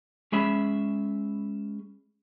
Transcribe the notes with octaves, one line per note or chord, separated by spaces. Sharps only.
G#3 C#4 G#4 E5 B5